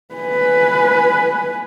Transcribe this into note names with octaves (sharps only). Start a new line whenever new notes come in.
B4 G#5